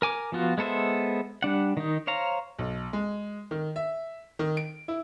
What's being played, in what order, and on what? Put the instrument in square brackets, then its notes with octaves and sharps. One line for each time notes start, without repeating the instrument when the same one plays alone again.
[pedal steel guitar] A#4 G#5 D6
F3 B3 F4 F#4
G#3 B3 A4 C5 E5
G3 D4 F#5
D#3 D#4
C5 C#5 F5 A#5
[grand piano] B1
G#3
D#3
E5
D#3
D7
E4